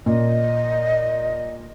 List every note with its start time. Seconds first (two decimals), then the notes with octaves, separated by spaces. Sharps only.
0.06 A#2 D#5